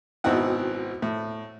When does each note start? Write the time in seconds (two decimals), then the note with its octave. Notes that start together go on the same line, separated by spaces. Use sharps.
0.24 G#1 B2 C4 D#4 E4 F#5
1.02 A2